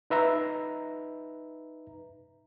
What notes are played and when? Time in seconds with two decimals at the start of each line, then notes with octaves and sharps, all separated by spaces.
0.10 D#4 B4 E5 A#5